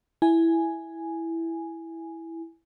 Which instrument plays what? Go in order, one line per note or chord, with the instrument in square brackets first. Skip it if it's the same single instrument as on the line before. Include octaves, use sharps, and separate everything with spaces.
[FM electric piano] E4 G#5